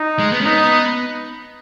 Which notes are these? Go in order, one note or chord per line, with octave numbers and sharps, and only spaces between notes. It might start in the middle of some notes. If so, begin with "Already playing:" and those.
Already playing: D#4
G#3
B3
C#4
B3 D#4